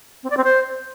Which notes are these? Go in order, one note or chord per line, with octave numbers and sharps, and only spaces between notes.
C4
D5
C4
C5